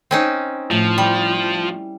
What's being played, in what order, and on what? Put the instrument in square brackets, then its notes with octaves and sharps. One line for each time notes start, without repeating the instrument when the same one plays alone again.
[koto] C4 C#4 D#4
[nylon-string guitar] A2 [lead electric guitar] F3
[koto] G3